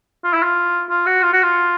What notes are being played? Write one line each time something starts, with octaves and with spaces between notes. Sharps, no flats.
F4
E4
F4
F4
F#4
F4
F#4
F4